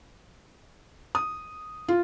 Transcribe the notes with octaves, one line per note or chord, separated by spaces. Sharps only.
D#6
F4